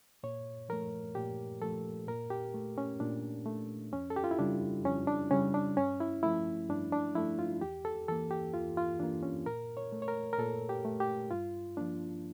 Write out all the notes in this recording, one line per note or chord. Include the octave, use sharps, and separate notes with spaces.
A#2 C#5
F3 A3 A#4
A#2 G4
F3 A3 A4
A#2 A#4
G4
A3
C#4
A#2 D4
A3
F2 C#4
A4
G4
F4
E4
C#3 G3 D4
F2 C#4
D4
C#3 G3 C#4
D4
G2 C#4
E4
F3 A3 E4
G2 D4
D4
F3 A3 E4
F4
E2 G4
A4
E3 A#3 A4
G4
E2 F4
F4
E3 A#3 D4
C#4
A#2 A#4
C#5
A3
C#5
A#4
A#4
A#2 A4
G4
A3
G4
G2 F4
F3 A#3 D4